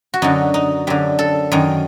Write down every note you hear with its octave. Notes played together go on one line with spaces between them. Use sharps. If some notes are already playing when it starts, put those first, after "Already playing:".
F#4
F#2 D3 D#4
D#4
F#2 D3 G4
A4
F#2 D#3